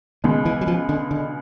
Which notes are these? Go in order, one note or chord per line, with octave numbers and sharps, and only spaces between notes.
C#2 B2 D#3 G#3
E3
F#3
F3
D3
D3